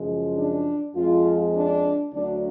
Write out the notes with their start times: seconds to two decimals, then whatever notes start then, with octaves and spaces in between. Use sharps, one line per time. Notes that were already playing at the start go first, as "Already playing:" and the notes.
Already playing: F#2 C#3 F3 G#3
0.36 D4
0.95 F2 F3 G#3 F4
1.54 D4
2.13 D2 D3 F#3 D4